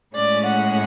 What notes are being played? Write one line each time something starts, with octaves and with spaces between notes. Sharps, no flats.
A2 G#3 C#4 D5
F#5